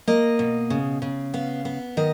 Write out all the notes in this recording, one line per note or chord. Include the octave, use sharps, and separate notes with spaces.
A#3 D#5
B2
C#3
C#3
B3 F5
B3
D#3 D#5